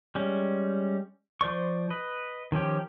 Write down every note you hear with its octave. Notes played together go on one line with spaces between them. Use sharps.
G3 G#3 C#4
F3 C5 D5 C#6
B4 D#5
D#3 F3 C#4 G4